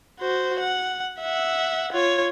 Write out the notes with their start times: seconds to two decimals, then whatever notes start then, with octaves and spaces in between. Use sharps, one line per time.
0.20 F#4 C5
0.60 F#5
1.21 E5 F#5
1.93 F4 C#5